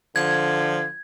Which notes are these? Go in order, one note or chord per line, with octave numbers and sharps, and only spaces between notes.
D3 F3 G#6